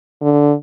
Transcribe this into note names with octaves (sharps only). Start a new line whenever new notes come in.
D3